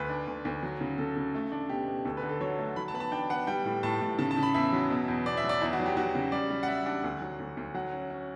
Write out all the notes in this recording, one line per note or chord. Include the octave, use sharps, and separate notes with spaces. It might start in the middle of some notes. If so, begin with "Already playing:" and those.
Already playing: D2 B4
D4
D2
D2
F#3
C#3
C#3 A4
C#3
A3
D4
B2 G4
B2
D2 A4
B4
D3
A4
F#3 C#5
A3
F#3 B5
A5
B3 B5
A5
D4 G5
B3 F#5
G3 G5
A2
A2 A5
A2
C#3 A5
A5
C#3
B5
E2 E5
F#3
B2
E2
B2 D5
E5
F#3
D5
E2 E4
F#4
F#3
G4
F#3 F#4
C#3
G3 D5
G3
F#5
G3 E5
D4 F#5
D2
F#3
D2
D2
F#3 F#5
C#4
C#4